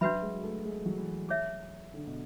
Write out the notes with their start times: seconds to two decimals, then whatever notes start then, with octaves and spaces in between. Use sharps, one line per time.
0.01 F#3 D4 F#4 B4 E5 B5
0.22 G#3
0.44 A3
0.65 G#3
0.86 F#3
0.97 E3
1.29 G#4 C#5 E5
1.94 D3
2.07 B2